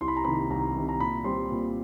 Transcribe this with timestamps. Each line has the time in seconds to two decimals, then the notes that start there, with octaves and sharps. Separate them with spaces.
0.01 C2 C6
0.08 B5
0.17 A#5
0.24 C3 D#3 B5
0.50 C2 A#5
0.76 C3 D#3
0.89 A#5
1.00 A#2 B5
1.24 G3 C4 C6
1.50 A#2